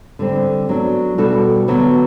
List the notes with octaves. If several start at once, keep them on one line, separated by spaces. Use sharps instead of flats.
D3 G3 C4
F#3 B3 D4
B2 G3 D4 F#4 A4
D3 F#3 B3